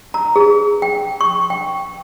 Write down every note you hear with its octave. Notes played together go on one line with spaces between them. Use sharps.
A#5
G#4
G5
C#6
G5